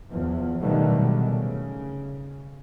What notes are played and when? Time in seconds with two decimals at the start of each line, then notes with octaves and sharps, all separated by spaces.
0.12 E2 F3
0.61 B2 D3 D#3 F#3 G3 A3
1.21 C#3